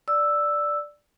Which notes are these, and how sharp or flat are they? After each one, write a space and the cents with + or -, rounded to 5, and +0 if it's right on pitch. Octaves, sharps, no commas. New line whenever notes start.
D5 +0 E6 +0